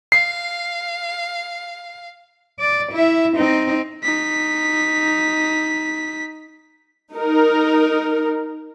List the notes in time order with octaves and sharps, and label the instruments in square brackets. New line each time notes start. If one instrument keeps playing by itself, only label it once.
[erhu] F5 [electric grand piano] C7
[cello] D5
E4 E5
C4 D#4
[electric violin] D#4 B6
[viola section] D#4 A#4